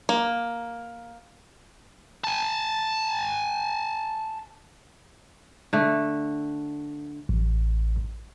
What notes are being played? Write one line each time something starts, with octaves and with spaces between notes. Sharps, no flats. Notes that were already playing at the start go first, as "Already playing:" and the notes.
A#3
G#5 A5
D3 A3
A1